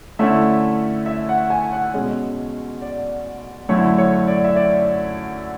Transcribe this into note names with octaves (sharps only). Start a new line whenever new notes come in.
D3 A3 C#4 E4 E5
E5
F#5
G#5
F#5
B2 G#3 C#4
D5
F#2 D3 A3 E4 C#5
C#5
D5
E5
D5